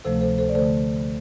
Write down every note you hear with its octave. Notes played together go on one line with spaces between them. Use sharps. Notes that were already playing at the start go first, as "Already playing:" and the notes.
D2 C3 F3 A3 A4 C5
A4 C5
A4 C5
D5
D3 A3 A4 C5